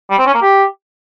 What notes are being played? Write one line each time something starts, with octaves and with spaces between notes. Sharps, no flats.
G3
C4
C#4
A#3
G4